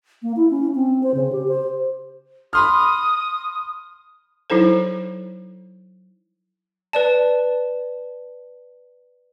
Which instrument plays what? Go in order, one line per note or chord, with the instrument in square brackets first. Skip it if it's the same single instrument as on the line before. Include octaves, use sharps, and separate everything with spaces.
[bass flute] A#3
E4
C#4
C4
C5
C#3
G4
C5
[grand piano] B5 C6 F6 [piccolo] D#6
[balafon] F#3 D#4 E4 A4 C5
[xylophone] B4 D5 A5